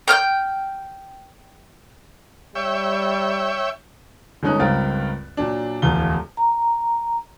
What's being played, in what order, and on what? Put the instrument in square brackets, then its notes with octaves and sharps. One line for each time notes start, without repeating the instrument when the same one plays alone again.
[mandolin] G5 F6 G6
[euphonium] G3 [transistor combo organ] C#5 E5 G5
[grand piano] G1 G#3 C#4 D#4 F#6
C#2 G2 C4 A#4 F5 A6
A#2 F#3 D4
D1 E2 F3 F4 G7
[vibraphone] A#5